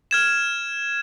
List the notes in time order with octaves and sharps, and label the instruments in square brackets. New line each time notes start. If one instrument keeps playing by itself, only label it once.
[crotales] F6 G#6 E7